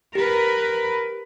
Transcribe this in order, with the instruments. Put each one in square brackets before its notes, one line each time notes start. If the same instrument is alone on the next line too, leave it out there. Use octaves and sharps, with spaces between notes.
[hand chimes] G4 [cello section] A#4 B4